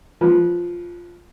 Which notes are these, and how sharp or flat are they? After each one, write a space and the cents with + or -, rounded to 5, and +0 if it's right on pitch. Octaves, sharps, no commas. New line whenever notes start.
F3 +0 B4 -15